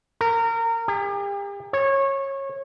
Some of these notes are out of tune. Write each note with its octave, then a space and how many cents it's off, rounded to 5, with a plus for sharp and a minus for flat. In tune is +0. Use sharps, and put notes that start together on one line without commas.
A#4 -25
G4 +40
C#5 -20